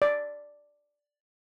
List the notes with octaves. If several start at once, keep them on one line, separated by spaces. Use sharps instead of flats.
D5